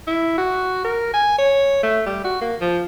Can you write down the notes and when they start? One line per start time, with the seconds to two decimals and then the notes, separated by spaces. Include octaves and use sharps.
0.07 E4
0.38 F#4
0.84 A#4
1.13 G#5
1.38 C#5
1.83 A3
2.06 G3
2.25 F#4
2.41 A#3
2.61 F3